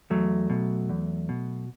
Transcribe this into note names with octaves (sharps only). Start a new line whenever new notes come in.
E2 F#3 A3
B2
E2
B2